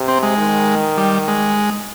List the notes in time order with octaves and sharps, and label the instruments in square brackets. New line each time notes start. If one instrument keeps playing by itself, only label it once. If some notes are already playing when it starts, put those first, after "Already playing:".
Already playing: [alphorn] C3
[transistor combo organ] C4
G#3
[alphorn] D#3
[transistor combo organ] G3
G#3